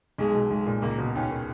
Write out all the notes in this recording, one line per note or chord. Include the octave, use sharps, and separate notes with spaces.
B1 G#3
B2
B1 G#3
A#2
C#2 A#3
B2
D#2 C#4
D#3